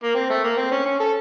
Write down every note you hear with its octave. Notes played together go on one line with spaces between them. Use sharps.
A#3
C4
A3
A#3
C4
C#4
C#4
A4